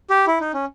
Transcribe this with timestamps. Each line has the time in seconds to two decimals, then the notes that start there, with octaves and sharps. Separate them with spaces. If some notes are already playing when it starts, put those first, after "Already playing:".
0.10 G4
0.27 E4
0.40 D#4
0.54 C#4